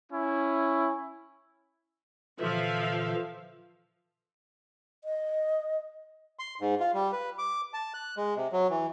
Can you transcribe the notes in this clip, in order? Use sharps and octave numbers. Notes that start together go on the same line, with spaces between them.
C#4 E4
A#2 D3 E3 F3 E5 F5
D#5
C6
G#2
F4
G3
B4
D6
A5
F#6
G#3
C3
F#3
E3